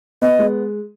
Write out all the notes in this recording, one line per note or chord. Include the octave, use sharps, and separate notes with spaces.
B3 D#5
G#3